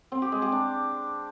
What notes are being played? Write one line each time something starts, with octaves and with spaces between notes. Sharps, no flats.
C4
G4
G#3
G4
D4